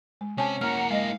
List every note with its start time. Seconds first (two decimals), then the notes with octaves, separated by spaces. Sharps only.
0.21 G#3
0.38 C3 C4 C#4 G#5 A5
0.61 A#3 E4 F#5 A#5 F6
0.91 G#3 D#5 F5